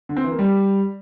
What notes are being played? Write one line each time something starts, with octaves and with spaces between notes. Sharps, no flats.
D3
C4
E3
A#3
G3